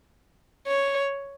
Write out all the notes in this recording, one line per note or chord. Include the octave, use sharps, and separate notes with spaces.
C#5